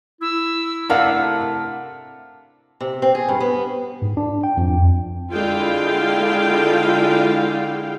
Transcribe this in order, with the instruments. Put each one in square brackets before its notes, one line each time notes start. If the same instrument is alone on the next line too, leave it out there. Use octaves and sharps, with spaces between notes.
[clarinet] E4 [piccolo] E6
[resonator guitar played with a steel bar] C3 A3 F#5 [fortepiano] D4 A#4 F5
[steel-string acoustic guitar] C3
C4
G#4
G2
B3
[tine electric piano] G#2
D4
G5
F2
[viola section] D3 G#3 E4 F4 F5 G5